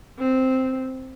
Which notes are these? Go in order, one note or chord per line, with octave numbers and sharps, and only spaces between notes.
C4